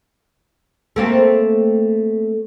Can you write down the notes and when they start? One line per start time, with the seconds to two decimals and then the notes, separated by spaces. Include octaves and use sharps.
0.96 A3 A#3 C4